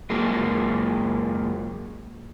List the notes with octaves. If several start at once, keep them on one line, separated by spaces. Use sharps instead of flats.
F#2 G#3 A#3